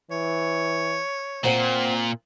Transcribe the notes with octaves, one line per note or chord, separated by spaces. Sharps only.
E3 C#5
A#2 C4 C5 F#5 G5